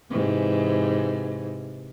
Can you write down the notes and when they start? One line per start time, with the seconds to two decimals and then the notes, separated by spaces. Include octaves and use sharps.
0.11 G#2 C3 E3